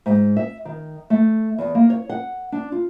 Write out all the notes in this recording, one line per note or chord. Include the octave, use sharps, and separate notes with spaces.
G#2
E5
D#3
A3
E2
A#3
C#5
F#5
D4
F4